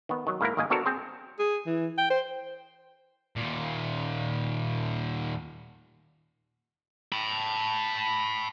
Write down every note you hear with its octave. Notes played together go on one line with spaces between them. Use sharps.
D#3 B3
D#3 F#3
G#2 A#3 E4 A#4
G#1 D#3 A#3 D#5 G#5
B3 D4 F#4 A4 A#4 C5
C4 G#4 C5
G#4
E3
G5
C5
D#2 A#2
A5 B5